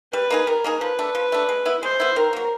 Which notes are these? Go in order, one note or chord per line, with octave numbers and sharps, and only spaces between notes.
G3 B4
A#3 D#4 G#4
G3 A#4
A#3 D#4 G#4
F3 B4
A3 D4
F3
A3 D4
G#3
B3 E4
G#3 C5
B3 E4
D#3 A#4
F#3 A#3